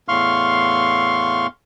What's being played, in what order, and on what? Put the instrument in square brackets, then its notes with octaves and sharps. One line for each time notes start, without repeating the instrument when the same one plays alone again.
[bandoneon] E2 A2 F5 C6 C#6 F6